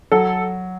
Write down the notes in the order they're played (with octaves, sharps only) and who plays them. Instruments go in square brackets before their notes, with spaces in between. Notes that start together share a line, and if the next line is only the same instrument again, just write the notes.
[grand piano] F#3 [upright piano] A4